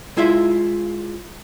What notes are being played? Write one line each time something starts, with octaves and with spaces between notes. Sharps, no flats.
G#3 E4 F4 E5